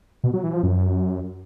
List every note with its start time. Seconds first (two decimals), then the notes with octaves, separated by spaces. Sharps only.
0.24 B2
0.34 F#3
0.43 E3
0.53 F3
0.63 F#2